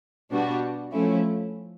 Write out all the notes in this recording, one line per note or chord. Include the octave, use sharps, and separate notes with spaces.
B2 G3 B3 D4 F#4
F3 A3 C#4 E4